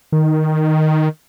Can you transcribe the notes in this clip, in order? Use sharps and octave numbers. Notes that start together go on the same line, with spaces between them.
D#3